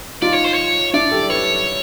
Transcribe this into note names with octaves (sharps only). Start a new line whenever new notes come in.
D#4 F4 D5
C#5
C5
C#5
D4 E4 D5
G4 A4
A4 B4 C#5